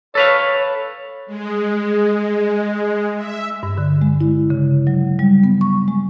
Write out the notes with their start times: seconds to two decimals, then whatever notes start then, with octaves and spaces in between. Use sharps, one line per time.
0.15 A4 B4 C#5 F5
1.26 G#3
3.16 E5
3.63 G2
3.78 D3
4.01 G#3
4.21 E4
4.50 C#3
4.87 F#3
5.19 G3
5.44 B3
5.61 C#6
5.88 G#3